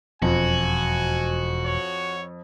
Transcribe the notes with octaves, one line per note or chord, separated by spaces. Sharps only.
E1 F2 F#4 G#5
C#5